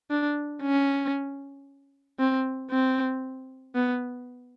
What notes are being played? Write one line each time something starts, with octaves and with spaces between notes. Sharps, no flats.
D4
C#4
C4
C4
B3